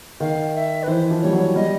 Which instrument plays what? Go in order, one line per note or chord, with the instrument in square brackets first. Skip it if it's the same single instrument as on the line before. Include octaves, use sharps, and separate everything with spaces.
[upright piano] D#3 [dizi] F5
[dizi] E5
B4
[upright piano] E3 [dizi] C5
[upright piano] F3
[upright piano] G3 [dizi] C#5
[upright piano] F#3
[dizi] C#5
[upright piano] G3 [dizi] D#5